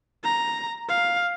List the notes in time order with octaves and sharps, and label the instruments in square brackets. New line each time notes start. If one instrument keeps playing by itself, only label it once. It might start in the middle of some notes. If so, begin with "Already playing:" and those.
[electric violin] A#5
F5